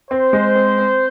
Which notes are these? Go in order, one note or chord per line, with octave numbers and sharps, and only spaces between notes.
C4 C5
G#3
C4
C4